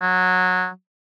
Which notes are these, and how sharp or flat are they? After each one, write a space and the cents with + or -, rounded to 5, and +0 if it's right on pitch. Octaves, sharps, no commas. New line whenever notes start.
F#3 -15